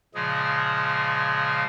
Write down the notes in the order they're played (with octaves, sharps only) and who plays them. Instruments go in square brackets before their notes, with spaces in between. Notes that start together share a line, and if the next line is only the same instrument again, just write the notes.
[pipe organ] A#2 C#3 F3 G#3 G#4